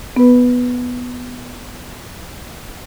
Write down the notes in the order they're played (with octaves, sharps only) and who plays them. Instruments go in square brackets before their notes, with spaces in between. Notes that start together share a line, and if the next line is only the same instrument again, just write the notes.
[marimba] B3 B4